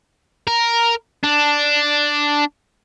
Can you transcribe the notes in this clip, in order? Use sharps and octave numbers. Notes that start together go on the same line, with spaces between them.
A#4
D4